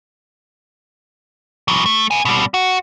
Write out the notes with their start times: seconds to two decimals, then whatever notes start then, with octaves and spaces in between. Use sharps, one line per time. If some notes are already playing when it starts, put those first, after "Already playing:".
1.68 E3 F#3
1.86 A3
2.11 B3 G#5
2.25 B2 G3
2.54 F#4